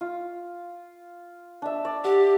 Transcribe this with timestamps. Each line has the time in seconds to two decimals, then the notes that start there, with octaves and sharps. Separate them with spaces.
0.01 F4
1.62 D4 E5
1.85 D5
2.04 G4 F#5